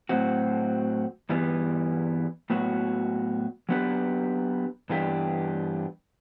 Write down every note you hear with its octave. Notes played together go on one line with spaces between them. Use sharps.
A2 F#3 C4 F#4
G2 E3 G3 B3
A2 F#3 B3 F#4
F#3 B3 D4 G4 B4
G2 E3 B3 D4 G4